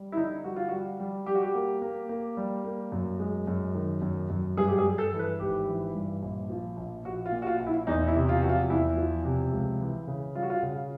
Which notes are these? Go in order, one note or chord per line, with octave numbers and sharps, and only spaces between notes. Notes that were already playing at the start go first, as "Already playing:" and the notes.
Already playing: G3
E4
D3 D#4
G3 F#4
F4
F#4
G3
G3
G3 G4
F#4
G4
A#3
A#3
A#3
G3
A#3
F#2
G#3
F#2
D#3
F#2
F#2
G2 G#4
G4
G#4
G2
A4
E3
B4
G#1 G4
E3
G2
A#1
F3
A#1
A#1 F#4
F4
A#2
F#4
F4
A#1
E4
E2 D#4
E4
C3
F4
F3 F#4
F4
E2 E4
F3
C3
C#2
E3
C#3
G3 F4
F#4
F4
C#3